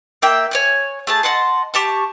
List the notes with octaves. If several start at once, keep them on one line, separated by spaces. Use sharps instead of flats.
A#3 E5 G5
C#5 G#5 F#6
A3 G#4 A5
D#5 F#5 A5 C6
G4 A5 C#6